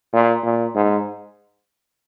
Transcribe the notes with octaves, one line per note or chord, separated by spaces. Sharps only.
A#2
A#2
G#2